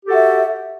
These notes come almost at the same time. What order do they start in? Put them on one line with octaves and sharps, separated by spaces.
G4 A4 F#4 E5